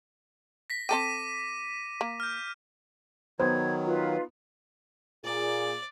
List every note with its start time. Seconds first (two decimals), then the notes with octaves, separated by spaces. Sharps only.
0.70 A#6 B6
0.89 C4 A4 G5 D6 D#7
2.01 A#3
2.20 F6 G6
3.40 D#3 F#3 B3 C5 G#6
3.86 D#4 F4 B4
5.25 A#2 G#4 D5